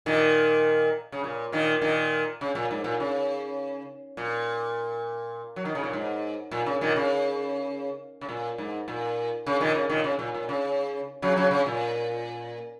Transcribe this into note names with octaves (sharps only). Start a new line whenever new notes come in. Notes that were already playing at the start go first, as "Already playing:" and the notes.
A#2 D#3
C#3
A#2
A#2 D#3
A#2 D#3
C#3
A#2
G#2
A#2
C#3
A#2
F#3
D#3
C#3
A#2
G#2
A#2
C#3
A#2 D#3
C#3
C#3
A#2
G#2
A#2
C#3
A#2 D#3
C#3
A#2 D#3
C#3
A#2
A#2
C#3
C#3 F#3
C#3 F#3
C#3
A#2